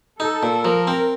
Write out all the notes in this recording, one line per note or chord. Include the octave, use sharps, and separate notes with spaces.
D#4 A4
A#2
F3 A#4
C4